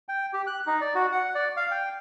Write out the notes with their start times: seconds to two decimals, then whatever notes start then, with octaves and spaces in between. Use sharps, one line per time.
0.09 G5
0.33 G4
0.47 F#6
0.67 D#4
0.81 D5
0.95 F#4
1.12 F#5
1.35 D5
1.57 F5
1.71 G5